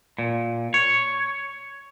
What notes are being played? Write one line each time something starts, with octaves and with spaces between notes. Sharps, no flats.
A#2
C#5